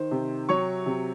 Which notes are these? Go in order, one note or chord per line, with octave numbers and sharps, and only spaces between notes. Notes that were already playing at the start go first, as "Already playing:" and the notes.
Already playing: D#3 C5
C3
F#3 C#5 C#6
C3